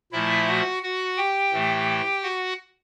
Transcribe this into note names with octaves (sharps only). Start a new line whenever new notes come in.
A#2 F3 A3 E4 E5
F#4 F#5
F#4 F#5
G4 G5
A2 E3 A3
F#4 F#5